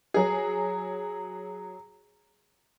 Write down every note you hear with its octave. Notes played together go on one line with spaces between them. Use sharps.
F#3 G#4